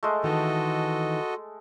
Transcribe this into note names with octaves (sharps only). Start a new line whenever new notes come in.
G#3 A3
D#3 E3 F#4 A4 D#5